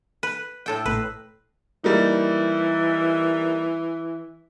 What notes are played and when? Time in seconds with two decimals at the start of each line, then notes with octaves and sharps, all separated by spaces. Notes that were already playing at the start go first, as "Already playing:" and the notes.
0.23 B4
0.66 A2 A4 G5
0.86 A1 A2 B4
1.84 E3 G3 A#3 D#4